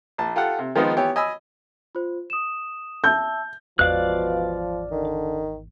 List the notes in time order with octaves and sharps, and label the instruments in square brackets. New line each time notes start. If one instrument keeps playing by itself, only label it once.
[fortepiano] A#1 A5
F4 G4 A4 F#5
C3
D#3 F3 G#3 B3 D#4
E3 B3 G4 C#5
D#5 G#5 B5 E6
[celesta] F4 C5
D#6 E7
[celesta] E5 A5 E6 [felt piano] G6
[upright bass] G#1 E2 [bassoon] B2 [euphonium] F3 [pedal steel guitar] D5 F5 F#6
[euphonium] D3 [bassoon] D#3